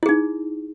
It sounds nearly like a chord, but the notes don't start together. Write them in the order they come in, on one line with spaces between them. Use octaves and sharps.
E4 G#4 D#4